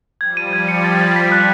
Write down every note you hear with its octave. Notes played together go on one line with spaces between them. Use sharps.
F3 G3 G#6
D#7
G#6
C#7
A6
A6
B6
F#6